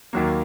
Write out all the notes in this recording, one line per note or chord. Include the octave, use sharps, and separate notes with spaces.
D#2 D#3 F#3 A#3